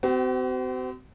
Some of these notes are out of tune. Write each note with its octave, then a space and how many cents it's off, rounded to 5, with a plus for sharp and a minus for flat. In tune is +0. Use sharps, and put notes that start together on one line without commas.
C4 -35 F#4 +40